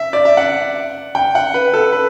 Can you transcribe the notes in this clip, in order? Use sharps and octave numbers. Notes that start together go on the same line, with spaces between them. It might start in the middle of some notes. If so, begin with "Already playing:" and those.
Already playing: E5
D5
E5
F#5
G5
F#5
B4
A4
B4